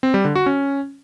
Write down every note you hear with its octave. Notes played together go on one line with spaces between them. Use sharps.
C4
G3
D3
F#4
C#4